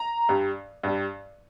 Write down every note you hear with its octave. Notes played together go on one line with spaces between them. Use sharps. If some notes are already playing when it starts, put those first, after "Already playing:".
Already playing: A#5
G2 G3
G2 G3